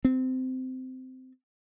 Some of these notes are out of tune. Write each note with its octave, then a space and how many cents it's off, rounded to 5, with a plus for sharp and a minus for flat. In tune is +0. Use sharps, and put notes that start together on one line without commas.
C4 -20